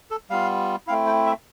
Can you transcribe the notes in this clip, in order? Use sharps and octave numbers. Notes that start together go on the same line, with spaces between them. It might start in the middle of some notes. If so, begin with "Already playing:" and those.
A4
G3 B3 F4 F5
A3 C4 E4 F5
G5
E5